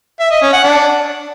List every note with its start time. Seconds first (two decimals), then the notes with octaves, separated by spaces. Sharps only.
0.20 E5
0.31 D#5
0.42 C#4
0.53 F#5
0.64 D4